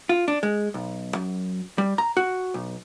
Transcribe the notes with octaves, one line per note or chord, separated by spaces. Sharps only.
F4
D4
G#3
B1
F#2
G3
A#5
F#4
B1